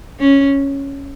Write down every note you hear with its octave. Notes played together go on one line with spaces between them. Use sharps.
C#4